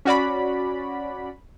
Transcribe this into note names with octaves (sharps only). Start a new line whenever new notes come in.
C#4 F#4 D5 B5